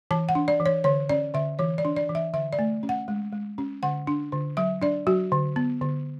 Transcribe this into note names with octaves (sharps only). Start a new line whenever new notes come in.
E3 A5
F#5
D4
D5
E3
C#5
D3 C#5
C#4 D5
D3 E5
E3 C#5
D5
D4
D5
E3
E5
D3 E5
D5
A3
C#4
F#5
G#3
G#3
C#4
D3 F#5
D4
D3
F#3 E5
D4 D5
F#3 F#4
D3
B3
D3